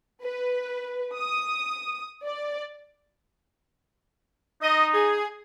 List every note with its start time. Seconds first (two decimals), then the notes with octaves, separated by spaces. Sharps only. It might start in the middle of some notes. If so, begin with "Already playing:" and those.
0.23 B4
1.16 D#6
2.25 D5
4.62 D#4 D#5
4.94 G#4